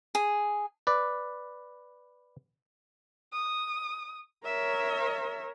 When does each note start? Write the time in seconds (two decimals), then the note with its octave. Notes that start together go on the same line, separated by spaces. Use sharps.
0.15 G#4
0.87 B4 D5
3.33 D#6
4.45 A#4 C#5 E5